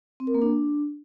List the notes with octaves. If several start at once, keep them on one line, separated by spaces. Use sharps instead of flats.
C4
A#4
A#3
D4